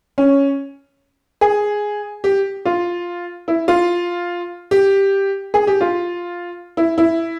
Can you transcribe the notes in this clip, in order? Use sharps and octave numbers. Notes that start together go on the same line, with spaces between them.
C#4
G#4
G4
F4
E4
F4
G4
G#4
G4
F4
E4
E4